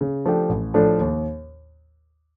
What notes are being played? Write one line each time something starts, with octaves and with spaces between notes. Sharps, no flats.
C#3
F3 A3 D4 G4
A1
A2 F3 A3 D4
D#2